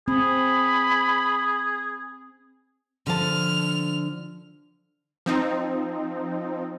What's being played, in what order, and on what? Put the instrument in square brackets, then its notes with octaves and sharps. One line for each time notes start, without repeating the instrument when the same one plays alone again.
[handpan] C4 [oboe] G#4 [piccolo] B5
[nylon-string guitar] D3 F3 A5 [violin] F6
[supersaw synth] F3 C4 D#4